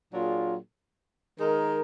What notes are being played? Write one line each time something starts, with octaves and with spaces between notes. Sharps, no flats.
A#2 F#3 D4 F4 G#4
D#3 G#3 D#4 A#4